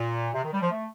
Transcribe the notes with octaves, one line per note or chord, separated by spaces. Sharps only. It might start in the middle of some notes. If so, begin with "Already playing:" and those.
Already playing: A#2
C3
D#3
G3
F3
A3